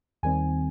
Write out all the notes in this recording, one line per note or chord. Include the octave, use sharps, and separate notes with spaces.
D#2 D#3 G3 C4 G#5